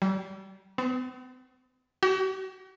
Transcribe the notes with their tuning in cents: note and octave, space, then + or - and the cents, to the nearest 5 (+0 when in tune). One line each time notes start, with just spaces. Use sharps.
G3 -40
B3 +45
F#4 +40